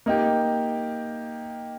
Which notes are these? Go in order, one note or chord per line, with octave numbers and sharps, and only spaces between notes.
A#3 D#4 G4